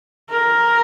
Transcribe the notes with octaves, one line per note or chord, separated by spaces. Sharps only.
A#4